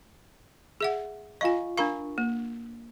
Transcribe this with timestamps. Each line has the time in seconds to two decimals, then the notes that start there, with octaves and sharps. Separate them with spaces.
0.81 G#4 E5 F#5
1.41 F4 D#5 F5 G#5 C#6
1.78 D4 A#4 F5 A#5 B5 C#6
2.18 A#3